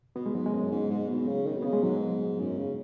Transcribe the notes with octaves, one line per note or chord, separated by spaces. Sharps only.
B2 B3
G#3
G#2 F#3
G#3
F#2
G#2
G#2
B2
C#3
D#3
B2
C#3 B3
G#3
G#2 F#3
F#2
C#3